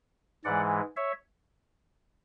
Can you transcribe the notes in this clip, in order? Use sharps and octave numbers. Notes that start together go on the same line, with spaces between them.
G#2 E3 G#3 D5 F#5
C#5 E5